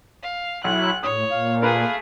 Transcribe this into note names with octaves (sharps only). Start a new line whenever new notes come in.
F5
B1 F#3 E4 F#6
A2 C#5 D#6
A#2 F5
A3 G#4 A#4 B4